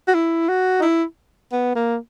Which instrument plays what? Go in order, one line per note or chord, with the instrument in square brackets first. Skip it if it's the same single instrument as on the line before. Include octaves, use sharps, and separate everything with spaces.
[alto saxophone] F#4
E4
F#4
D#4
E4
B3
A#3